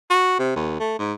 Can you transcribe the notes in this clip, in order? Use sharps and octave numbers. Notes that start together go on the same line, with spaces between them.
F#4
C3
D#2
A3
G#2